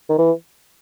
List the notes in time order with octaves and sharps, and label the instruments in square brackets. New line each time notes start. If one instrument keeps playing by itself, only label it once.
[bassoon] D#3
E3